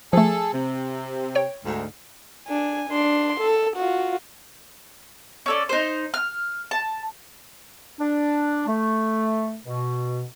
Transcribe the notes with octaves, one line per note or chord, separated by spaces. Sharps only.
F3 A3 G#4 A4
C3
C#5 G5
D2 G#2
D4 G#5
D4 C6
A4
F4 F#4
C#4 A4 D5
D#4 C5
F6
A5
D4
A3
B2